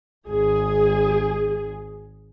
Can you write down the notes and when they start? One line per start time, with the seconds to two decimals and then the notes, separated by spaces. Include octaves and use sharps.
0.28 G#1 G#4